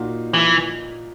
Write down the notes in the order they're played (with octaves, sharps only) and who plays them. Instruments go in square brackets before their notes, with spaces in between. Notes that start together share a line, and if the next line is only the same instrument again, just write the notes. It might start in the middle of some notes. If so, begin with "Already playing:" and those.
Already playing: [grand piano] A#2 A#3 D#4 F#4
[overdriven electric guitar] E3